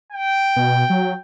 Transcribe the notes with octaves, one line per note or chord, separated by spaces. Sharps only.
G5
B2
F#3